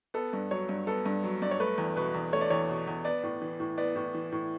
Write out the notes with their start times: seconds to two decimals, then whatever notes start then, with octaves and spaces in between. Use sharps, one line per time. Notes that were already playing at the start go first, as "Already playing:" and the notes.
0.14 B3 A4
0.33 G2
0.51 F#3 C#5
0.69 G2
0.87 B3 A4
1.06 G2
1.24 F#3
1.42 G2 D5
1.51 C#5
1.60 A3 B4
1.78 E2
1.96 B2 B4
2.14 E2
2.33 A3 C#5
2.41 D5
2.50 E2 C#5
2.69 B2
2.87 E2
3.05 B3 D5
3.23 A2
3.42 E3
3.60 A2
3.78 B3 D5
3.96 A2
4.14 E3
4.32 A2